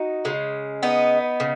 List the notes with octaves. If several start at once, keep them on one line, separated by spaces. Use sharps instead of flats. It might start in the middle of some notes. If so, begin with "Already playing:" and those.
Already playing: D#4 F#4
C#3 G#3
B3 D#4
C#3